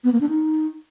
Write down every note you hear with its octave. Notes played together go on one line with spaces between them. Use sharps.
B3
A#3
D4
D#4